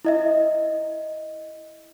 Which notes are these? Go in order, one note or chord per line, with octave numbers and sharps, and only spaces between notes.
E4 D#5 E5